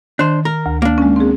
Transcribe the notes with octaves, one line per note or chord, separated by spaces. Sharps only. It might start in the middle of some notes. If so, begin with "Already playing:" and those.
D#3 D4 C5
A#4
D2
A#3 D4
G#3 C#4
C4 G#4